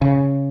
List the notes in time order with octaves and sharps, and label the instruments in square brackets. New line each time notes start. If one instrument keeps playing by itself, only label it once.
[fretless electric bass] C#3